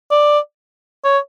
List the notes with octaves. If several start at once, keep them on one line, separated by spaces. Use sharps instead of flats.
D5
C#5